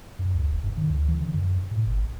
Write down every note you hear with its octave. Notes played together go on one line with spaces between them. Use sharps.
F#2
D2
F1
G2
D#3
D2
E3
D3
F#2
A2
G1
A#1